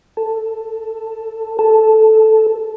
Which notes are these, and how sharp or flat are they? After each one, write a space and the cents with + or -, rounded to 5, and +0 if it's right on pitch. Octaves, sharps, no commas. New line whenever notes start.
A4 +10
A4 -5